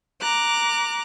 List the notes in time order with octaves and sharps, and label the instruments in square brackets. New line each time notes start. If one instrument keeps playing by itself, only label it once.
[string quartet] A#5 D6 F#6